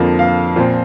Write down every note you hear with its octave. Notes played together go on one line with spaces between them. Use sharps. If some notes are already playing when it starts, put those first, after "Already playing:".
Already playing: F2 D3 F3 A#3
F5
A#2 F3 C4